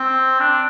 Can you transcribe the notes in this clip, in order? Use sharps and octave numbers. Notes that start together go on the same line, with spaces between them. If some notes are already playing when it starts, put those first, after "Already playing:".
Already playing: C4
D4